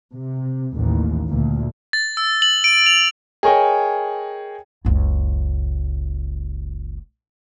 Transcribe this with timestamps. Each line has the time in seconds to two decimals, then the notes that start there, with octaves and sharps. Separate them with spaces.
0.15 C3
0.76 A1 D#2
1.29 D2 A#2
1.93 A6
2.17 E6
2.42 F#7
2.64 D7
2.86 F7
3.43 G#4 A#4 C#5 D#5 G5
4.85 F#1 C#2